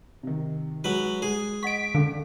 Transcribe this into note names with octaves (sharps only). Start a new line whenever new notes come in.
C3 D#3
F#3 G#3 B4
G#3 G#4
D#5 F#5 C#6 B6 D7
D3 C#4 A4 F5